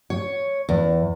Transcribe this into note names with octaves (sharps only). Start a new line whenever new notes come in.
C#5
E2